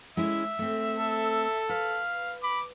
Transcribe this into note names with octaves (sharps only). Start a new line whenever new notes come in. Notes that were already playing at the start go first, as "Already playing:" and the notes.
G#3 C#4 E4 E5
A3 C4
A4
B4 F5
B5 D6